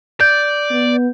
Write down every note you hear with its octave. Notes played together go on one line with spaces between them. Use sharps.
D5 G6
B3